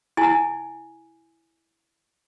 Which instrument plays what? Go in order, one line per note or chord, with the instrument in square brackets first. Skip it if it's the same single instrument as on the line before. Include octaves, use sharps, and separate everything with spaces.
[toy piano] E4 G#5